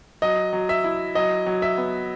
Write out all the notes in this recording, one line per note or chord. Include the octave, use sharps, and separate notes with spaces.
F#3 D#5
F#3
E5
E4
F#3 D#5
F#3
E5
B3